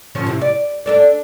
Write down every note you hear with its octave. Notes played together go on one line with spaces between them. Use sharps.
D3 F3 C#4
C3 E4
D5
D4 A4 D5